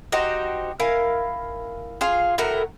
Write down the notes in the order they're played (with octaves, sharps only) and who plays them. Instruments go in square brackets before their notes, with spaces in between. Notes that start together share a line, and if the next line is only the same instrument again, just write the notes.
[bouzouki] D#4 F#4 G4 C5
E4 A#4 F5 G#5
F4 G#4 F5
A2 A3 F#4 A#4